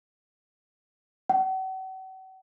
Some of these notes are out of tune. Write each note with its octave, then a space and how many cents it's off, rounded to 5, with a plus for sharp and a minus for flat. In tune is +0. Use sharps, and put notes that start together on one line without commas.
F#5 +40